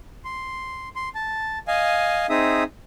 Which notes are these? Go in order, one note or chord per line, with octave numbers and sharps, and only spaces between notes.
C6
C6
A5
D#5 F5 G#5
C4 D#4 G#4 E5 D#6